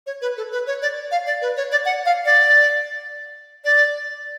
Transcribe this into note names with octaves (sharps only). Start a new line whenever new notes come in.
C#5
B4
A4
B4
C#5
D5
F5
D5
B4
C#5
D5
F#5
F5
D5
D5